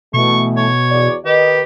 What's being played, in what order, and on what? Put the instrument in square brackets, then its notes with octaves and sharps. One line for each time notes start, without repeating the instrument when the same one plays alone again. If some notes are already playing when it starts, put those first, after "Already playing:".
[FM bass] B2 [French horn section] E3 A3 [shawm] C#6
[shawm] C#5
[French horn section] E2 F#4 D5
[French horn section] D#3 B4 D#5 [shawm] G4